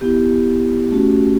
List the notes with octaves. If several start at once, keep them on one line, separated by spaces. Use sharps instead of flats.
B3 E4 G4
A3 C#4 F#4